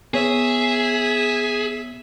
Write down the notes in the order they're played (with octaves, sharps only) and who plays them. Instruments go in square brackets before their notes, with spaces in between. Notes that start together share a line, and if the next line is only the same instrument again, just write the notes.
[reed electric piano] B3 C#5 [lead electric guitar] G#4 [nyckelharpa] E5